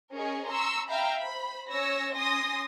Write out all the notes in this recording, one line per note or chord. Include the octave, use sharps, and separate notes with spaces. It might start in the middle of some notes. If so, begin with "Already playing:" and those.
C#4 G#4 A#4 C#5 D#5
A#5 C6 C#6 E6
E5 F5 G5 A#5 B5
C5 B5
C#4 C#5 E6 A#6
C#4 G#5 C6 D#6 A#6